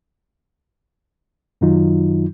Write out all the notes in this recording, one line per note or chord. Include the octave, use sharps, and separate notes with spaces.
F#2 D#3 F#3 D#4 F4